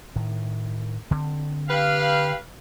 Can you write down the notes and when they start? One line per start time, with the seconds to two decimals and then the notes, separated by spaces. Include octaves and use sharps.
0.16 A2 D#3
1.11 D3 C4
1.69 G4 B4 F5